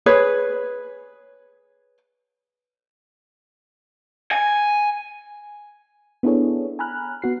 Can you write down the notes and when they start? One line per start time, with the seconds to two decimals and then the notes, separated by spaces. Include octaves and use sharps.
0.06 G#4 B4 C#5
4.31 G#5
6.23 B3 D4 E4 G#4 A4 C#5
6.79 G#5 A#5 B5 F6 F#6
7.22 B3 F#4 C7